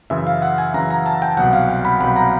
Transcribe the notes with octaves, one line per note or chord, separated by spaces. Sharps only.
F#2 C#3 E3 E5
F5
F#5
G#5
F#2 C#3 E3 A#5
A#5
A5
G5
C2 B2 F#3 F#5
F5
G5
B5
C2 B2 F#3 B5
A#5